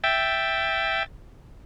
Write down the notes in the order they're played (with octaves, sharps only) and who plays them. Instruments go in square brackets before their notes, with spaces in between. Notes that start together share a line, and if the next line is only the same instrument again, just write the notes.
[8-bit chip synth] E5 G5 A6